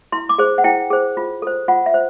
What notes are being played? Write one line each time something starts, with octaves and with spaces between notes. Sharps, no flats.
E4 C6
D6
G#4 C5
F#5
E4 G5
G#4 C5
F4
A4 C5
F4 F#5
E5
C5